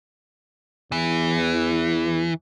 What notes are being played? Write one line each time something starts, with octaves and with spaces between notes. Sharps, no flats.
E2 E3